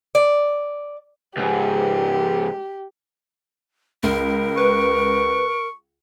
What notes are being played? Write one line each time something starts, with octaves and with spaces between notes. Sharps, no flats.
D5
C#2 G#2 G4
C#2 A#4
B4 C#6